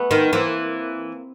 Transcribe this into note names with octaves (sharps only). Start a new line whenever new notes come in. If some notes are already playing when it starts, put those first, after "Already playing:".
Already playing: A3 B3
D#3
E3 A#3 C4